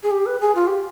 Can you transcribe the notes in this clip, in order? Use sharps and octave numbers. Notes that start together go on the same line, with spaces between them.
G#4
G4
B4
G#4
F4
G4